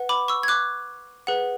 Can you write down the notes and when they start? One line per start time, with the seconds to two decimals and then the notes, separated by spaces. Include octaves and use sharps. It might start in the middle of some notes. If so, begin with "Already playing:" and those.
Already playing: B4 F#5
0.09 B5 D6
0.28 C#6 E6
0.43 G#6
0.48 D6 F#6
1.27 G#4 B4 F#5